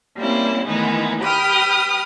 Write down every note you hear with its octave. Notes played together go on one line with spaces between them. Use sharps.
G3 A#3 C4 C#4 E4
D#3 E3 G#3 A3 B3 D#4
G4 B4 G5 D#6 F6